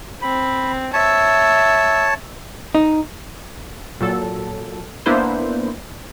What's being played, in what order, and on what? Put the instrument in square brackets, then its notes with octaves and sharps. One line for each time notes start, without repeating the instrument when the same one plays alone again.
[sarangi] C4 [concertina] B5
[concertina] C#5 A5 [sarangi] E5
[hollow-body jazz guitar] D#4
[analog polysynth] A#2 F#3 A4
A#3 B3 D4 E4 B4 C5